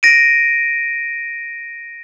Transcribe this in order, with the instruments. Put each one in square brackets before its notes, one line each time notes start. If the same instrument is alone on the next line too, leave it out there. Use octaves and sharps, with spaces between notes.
[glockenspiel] A#6 D7 D#7